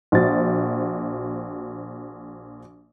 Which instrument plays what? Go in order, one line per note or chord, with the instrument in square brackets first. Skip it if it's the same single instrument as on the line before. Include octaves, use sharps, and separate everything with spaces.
[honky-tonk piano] A#1 F#4 C5 A6